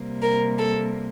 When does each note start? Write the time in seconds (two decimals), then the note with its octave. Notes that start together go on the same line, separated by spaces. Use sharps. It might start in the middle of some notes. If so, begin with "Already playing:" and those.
Already playing: C3 G3 A#3
0.22 A#4
0.58 A4